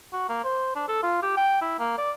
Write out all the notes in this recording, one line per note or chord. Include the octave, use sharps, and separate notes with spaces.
F#4
A#3
C5
D4
A4
F4
G4
G5
E4
A#3
D5